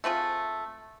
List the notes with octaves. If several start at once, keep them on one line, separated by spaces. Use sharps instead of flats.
A3 C4 F4 G#4